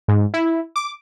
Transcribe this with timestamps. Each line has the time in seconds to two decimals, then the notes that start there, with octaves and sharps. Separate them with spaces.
0.08 G#2
0.34 E4
0.76 D6